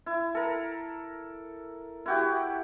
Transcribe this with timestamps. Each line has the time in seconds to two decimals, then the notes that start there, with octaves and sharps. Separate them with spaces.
0.06 E4
0.35 A4 A#4
2.06 E4 F#4 G4